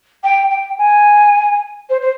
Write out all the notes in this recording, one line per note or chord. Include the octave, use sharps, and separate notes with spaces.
G5
G5
G#5
C5
C5